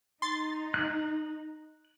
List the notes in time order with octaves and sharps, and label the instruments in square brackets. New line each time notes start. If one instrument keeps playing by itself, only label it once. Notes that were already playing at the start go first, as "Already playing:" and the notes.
[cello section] D#4 [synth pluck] C6 A6
[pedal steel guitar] F#6